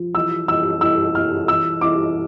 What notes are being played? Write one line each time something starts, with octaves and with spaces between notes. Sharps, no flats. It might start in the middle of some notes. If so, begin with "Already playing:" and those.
Already playing: F3
E3 E6
E3 E6
E3 E6
E3 F6
E3 E6
E3 D6